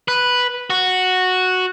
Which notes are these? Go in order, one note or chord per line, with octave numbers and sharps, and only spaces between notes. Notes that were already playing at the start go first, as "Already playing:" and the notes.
B4
F#4